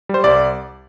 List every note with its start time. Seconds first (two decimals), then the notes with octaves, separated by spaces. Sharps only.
0.09 G3 C5
0.24 C2 D5